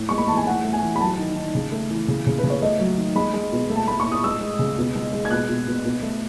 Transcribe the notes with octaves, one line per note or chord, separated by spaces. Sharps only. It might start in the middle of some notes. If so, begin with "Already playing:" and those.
Already playing: A2
G#3 C#6
B5
E3 A5
G#5
A2 F#5
A3
G#5
E3
B5
F#3 A5
D#3
D#3
C#3
A3
E3
C#3
C#3
B4
C#3
C#5
A3 D#5
F#3
D#3
G#3 B5
G#3
B2
A3
A5
A3 B5
C#6
A2
D#6
G#3 E6
G#3
C#3
B2
G#3
G#3
G#6
B2 F#6
B2
B2
B2
A3